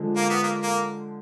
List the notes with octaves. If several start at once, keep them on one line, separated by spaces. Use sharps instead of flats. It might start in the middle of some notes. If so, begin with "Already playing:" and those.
Already playing: D3 F3 G#3
A#3
B3
A#3
A#3